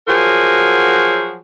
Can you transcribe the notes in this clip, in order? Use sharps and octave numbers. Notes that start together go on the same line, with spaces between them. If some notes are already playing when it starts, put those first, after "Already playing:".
F3 F#3 F#4 G#4 A#4